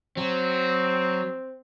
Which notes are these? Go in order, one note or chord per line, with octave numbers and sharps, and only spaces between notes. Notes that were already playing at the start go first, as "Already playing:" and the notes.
F#3 C4